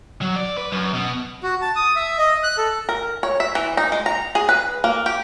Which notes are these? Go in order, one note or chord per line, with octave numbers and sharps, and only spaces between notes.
F#3
D5
B4
F#2
B2
F#4
A5
D#6
E5
D#5
F#6
A4
A#4
C#5
E5
E3
D#4
G#3
A#5
G#4
B4
A#3
G4